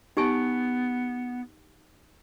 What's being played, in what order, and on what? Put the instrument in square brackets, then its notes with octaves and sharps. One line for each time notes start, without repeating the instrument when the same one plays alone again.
[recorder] B3 [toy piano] D#4 G4 G#5